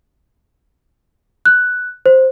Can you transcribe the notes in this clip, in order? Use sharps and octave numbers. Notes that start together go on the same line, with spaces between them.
F#6
C5